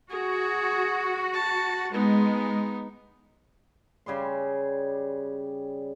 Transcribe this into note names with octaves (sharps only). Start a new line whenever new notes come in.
F#4 G#4
A5
G#3 B3 D#4
C#3 G3 G#4 C6